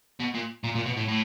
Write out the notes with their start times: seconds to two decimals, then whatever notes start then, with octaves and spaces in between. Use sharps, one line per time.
0.20 B2
0.34 A#2
0.64 A#2
0.75 A#2
0.86 B2
0.97 A2
1.08 A2